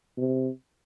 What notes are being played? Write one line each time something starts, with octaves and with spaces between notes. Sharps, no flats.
C3